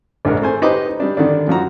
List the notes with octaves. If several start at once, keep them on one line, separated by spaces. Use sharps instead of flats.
A#1 G#2 A#4
A3 C5 G#5
D#4 G4 B4 C5 D#5 D6
G3 D4
D3 D#3 D4
F#2 F3 F#4 A#5